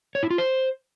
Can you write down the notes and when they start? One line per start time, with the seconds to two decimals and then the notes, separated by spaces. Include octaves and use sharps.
0.15 C#5
0.23 E4
0.30 F4
0.38 C5